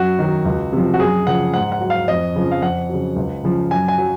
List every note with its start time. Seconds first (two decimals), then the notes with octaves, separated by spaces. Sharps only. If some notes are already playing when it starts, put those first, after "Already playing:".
Already playing: F#2 F#4
0.19 D#3 F#3
0.45 C#2
0.73 C3 F3
0.94 F#4
0.99 F#2 G#4
1.27 C#3 F3 F#5
1.54 G#2 F#5
1.72 F#5
1.81 F#3
1.90 F5
2.08 F2 D#5
2.35 C#3 F3
2.51 F5
2.62 F2 F#5
2.89 C#3 F#3
3.16 C#2
3.44 C#3 F3
3.71 F#2 G#5
3.88 G#5
3.98 F#3